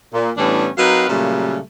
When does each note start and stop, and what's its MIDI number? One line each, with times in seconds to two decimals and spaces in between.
0.13 0.31 46
0.38 0.68 45
0.38 0.68 52
0.38 0.68 55
0.38 0.68 59
0.38 0.68 61
0.38 0.68 62
0.78 1.05 54
0.78 1.05 60
0.78 1.05 63
0.78 1.05 70
0.78 1.05 71
0.78 1.05 77
1.08 1.59 46
1.08 1.59 49
1.08 1.59 54
1.08 1.59 55
1.08 1.59 57
1.08 1.59 58